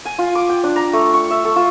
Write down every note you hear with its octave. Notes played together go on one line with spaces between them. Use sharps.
G#5
F4
D6
G5
D4
A#5
A3
C#6
E5
A4
F4